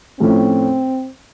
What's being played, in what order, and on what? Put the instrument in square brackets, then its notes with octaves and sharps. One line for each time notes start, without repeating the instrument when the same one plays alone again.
[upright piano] A2 F3 A3 C#4 [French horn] C4